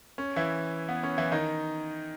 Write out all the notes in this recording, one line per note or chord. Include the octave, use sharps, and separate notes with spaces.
C#4
E3 E4
B3
C#4
E3 E4
D#3 D#4